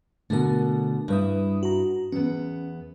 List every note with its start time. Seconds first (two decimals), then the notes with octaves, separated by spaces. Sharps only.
0.30 B2 D3 A3 A#4
1.08 G2 G3 E4 B4 D#6
1.63 F#4 A#5
2.12 E2 B3 C#4